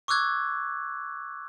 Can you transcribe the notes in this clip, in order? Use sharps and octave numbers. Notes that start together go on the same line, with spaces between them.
C#6 D6 E6 F#6 G#6